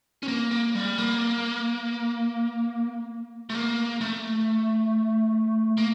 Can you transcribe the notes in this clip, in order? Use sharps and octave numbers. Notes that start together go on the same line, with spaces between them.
C#4
A#3
A#3
G3
A#3
A3
A#3
A3
A#3